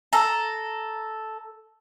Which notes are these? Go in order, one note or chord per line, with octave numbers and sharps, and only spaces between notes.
A4 A#5